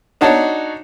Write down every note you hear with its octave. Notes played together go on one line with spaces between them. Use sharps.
D4 D#4 F#4 C#5 A5